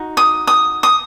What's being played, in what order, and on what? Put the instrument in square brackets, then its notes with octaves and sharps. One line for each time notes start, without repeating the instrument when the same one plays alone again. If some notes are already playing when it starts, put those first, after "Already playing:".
Already playing: [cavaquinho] D#4 F#4
D#6
D#6
D#6